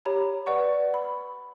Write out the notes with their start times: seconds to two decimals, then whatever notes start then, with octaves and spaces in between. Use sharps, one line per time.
0.05 G4 C#5 A#5 B5
0.46 B4 D5 F#5 C#6
0.94 B5